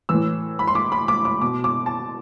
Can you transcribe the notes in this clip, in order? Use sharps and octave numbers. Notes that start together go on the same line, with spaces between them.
A2 E3 E6
B5
C6
D6
B5
D6
D6
B2 D6
D6
A5